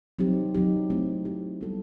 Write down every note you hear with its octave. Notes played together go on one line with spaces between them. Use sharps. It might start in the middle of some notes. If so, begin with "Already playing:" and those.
F#3 C4 D#4 G4
F#3 C4 D#4 G4
A3 C4 E4 G4
A3 C4 E4 G4
G3 B3 F#4 A4